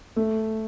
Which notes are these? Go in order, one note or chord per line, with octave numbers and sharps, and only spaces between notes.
A3